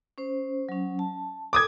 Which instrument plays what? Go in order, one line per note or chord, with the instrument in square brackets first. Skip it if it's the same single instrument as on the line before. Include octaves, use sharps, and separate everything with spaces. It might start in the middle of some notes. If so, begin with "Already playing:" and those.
[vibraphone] C#4 C5
F#3 C#4
A5
[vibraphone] A4 [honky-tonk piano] D6 D#6 G#6